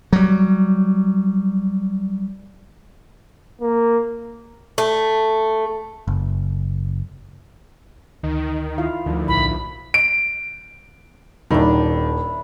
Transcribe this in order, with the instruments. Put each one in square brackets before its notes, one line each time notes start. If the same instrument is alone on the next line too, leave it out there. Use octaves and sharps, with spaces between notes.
[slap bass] F#3 G3
[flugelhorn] A#3
[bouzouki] A3
[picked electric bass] F#1
[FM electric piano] D2 [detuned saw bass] D#3
[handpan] E4 F4 F5
[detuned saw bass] D2 [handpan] D#3 F3
[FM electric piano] B1 A2 [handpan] E4 [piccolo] B5
[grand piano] D7
[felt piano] D#1 [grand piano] D#3 [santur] D4 E4